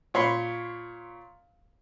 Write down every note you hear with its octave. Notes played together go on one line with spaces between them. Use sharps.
A#2 C#5 B5 C6